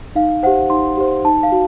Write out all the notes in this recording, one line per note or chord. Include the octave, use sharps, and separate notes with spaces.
D#4 F5
G4 C5 F#5
D#4 C6
G4 C5
D#4 A5
F5
F#4